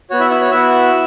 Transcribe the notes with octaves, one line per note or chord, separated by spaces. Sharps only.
B3 F#4 C#5
E4 E5
E4 E5
C#5
B3 E4 F#4 E5